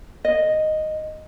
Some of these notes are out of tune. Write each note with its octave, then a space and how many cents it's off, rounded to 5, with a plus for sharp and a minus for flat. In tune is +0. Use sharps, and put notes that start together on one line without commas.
D#5 -5